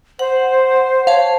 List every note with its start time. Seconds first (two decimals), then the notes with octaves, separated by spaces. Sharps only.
0.19 C5 F#5
1.07 C5 C#5 F5 A5